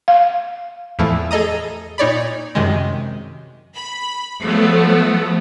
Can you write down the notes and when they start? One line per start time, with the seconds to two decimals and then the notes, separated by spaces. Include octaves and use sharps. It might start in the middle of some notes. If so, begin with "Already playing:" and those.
0.08 F5
0.99 E2 A2 E3 F3 A3 E4
1.31 G#4 A4 D#5 A#5 D#6
1.98 A#2 D#4 C#5 D5 B5
2.55 F#2 C3 D#3 G#3
3.76 B5
4.41 F3 F#3 A3 B3